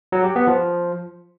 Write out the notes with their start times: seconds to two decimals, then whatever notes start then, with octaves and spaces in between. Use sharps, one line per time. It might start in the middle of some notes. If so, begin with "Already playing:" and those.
0.12 F#3
0.24 G4
0.36 B3
0.47 F3